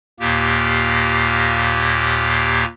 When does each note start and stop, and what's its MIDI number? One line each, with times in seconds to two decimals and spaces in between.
0.20 2.65 39
0.20 2.65 46
0.20 2.65 58
0.20 2.65 67